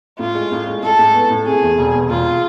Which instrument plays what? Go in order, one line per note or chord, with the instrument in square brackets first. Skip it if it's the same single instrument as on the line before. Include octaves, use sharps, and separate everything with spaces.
[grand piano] A2 [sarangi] F4
[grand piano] G#3
A2
G#3
[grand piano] G#3 [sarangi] A4
[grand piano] A2
B3
A2
[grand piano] C3 [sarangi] G#4
[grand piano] E2
E1
E2
[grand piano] E1 [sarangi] F4